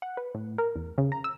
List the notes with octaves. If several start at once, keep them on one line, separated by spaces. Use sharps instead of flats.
F#5
B4
A2
A#4
E2
C#3
A#5
E6